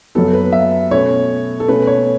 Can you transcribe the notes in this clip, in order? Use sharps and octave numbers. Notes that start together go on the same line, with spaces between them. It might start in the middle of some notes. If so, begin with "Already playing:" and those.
F#2 F#3 B3 A4
B4
E5
B2 A3 C#4 C#5
A4
B2 A3 C#4 B4
C#5